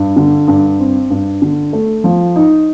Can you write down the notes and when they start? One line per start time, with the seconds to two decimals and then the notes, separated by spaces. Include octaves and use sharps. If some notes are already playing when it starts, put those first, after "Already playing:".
Already playing: G2
0.16 D3
0.48 G2
0.79 C4
1.10 G2
1.42 D3
1.73 A3
2.04 F3
2.36 D#4